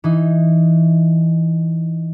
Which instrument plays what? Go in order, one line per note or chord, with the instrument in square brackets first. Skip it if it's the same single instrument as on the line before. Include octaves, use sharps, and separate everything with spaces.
[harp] E3 D#4